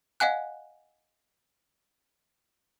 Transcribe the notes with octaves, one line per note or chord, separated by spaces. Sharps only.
D#5 F5 F#5 G#5 F#6